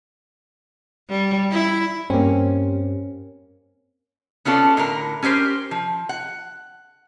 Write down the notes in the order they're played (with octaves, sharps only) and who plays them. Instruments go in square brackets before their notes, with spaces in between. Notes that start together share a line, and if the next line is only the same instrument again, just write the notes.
[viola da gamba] G3
E4
[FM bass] G2 [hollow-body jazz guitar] A#3 C#4 [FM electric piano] C4 G4
[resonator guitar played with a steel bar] B3 C#4 F4 A4 D5
A2 D3 A#4 A#5
C#4 G4 A#4 C5
F3
F#5